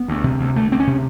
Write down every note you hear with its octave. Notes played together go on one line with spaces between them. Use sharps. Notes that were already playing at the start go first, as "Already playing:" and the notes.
Already playing: B3
D2
C3
D2
D2 A3
D2 C4
C#4
C3